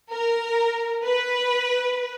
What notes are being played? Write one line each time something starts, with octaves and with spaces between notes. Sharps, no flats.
A#4
B4